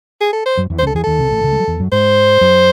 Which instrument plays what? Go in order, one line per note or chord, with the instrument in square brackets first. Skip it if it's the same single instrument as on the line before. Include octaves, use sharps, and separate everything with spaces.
[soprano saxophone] G#4
A4
C5
[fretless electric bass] F#2 F#3
E2 E3
[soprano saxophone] C5
[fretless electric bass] C#2 C#3 [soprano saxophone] A4
[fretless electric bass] E2 E3 [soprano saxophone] G#4
[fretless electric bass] D#2 D#3 [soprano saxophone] A4
[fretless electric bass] C2 C3
A1 A2
C#2 C#3
G#3
F#3
E2 E3
F#2 F#3
[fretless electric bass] G#2 G#3 [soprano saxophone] C5
[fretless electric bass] F#2 F#3